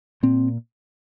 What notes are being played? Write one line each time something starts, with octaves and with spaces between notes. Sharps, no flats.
A#2 C4